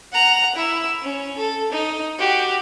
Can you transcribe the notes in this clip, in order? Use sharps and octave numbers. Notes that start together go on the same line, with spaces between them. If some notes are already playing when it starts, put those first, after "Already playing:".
F#5 A#5
E4 E6
C#4
A4
D#4
F#4 G4